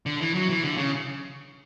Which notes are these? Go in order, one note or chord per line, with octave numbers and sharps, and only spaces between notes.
D3
E3
F#3
E3
D3
C#3